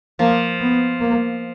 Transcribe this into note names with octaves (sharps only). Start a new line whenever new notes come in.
F3 A#3
B3
A#3